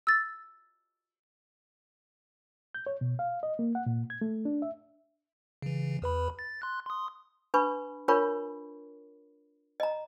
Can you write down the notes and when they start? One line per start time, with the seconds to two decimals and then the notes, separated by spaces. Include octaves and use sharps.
0.07 E6 A6
2.75 G6
2.87 C#5
3.01 B2
3.19 F5
3.43 D#5
3.59 A#3
3.75 F#5
3.86 A#2
4.10 G#6
4.21 A3
4.45 D4
4.62 E5
5.62 C#3 E3
6.02 E2 B4 B5
6.39 A6
6.62 C6 F#6
6.86 C6 D#6
7.54 D4 B4 B5 C#6
8.08 D4 F4 A#4 C#5 B5 C#6
9.80 D#5 A#5